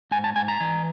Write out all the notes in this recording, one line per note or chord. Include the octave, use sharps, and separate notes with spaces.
G#2 G#5
A5
G#2 G#5
A#5
E3